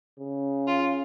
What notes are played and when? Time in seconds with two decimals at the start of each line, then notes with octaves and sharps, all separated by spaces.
0.20 C#3
0.67 F4